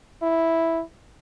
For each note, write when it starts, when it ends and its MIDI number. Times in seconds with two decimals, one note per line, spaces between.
0.22 0.82 64